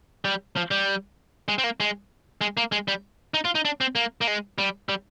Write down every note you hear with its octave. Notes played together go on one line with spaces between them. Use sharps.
G3
F3
G3
G#3
C4
A#3
G#3
G#3
A#3
G#3
G3
D#4
F4
D#4
D4
C4
A#3
A#3
G#3
G3
G3